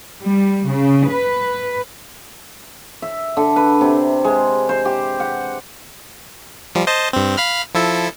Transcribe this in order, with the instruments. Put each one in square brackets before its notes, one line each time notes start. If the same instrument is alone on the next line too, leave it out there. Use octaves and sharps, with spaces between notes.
[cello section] G3
C#3
B4
[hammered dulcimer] E5
D3
B4
C3
G#3
C5
G4
F#5
[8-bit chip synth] F3 G3
C5 D#5 A5
G2 C4
F5 B5 F6
F3 E4 A4